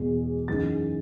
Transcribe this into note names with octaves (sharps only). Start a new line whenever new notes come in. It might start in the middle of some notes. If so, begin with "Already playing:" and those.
Already playing: E2 B2 G#3
F#2 E3 G#3 D#4 A6